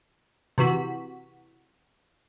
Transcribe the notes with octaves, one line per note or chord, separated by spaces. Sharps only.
C3 E3 F#4 B6